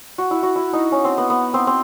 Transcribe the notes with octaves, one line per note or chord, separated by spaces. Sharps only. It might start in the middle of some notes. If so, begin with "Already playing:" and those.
F#4
E4
F#4
E4
D#4
C#4
C4
B3
B3
C4
C4